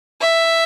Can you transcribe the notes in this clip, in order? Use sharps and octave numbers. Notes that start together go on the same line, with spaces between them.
E5